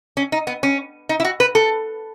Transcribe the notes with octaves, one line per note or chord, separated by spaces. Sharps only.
C#4
D#4
B3
C#4
D#4
E4
F#4
B4
A4